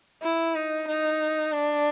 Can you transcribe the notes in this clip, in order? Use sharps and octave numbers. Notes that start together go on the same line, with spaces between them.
E4
D#4
D#4
D4